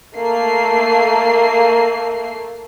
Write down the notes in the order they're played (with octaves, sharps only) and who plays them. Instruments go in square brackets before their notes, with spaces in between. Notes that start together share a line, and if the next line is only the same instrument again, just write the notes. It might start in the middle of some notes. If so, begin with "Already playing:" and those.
[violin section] A3 A#3 C7